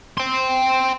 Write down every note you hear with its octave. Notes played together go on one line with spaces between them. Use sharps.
G5 C6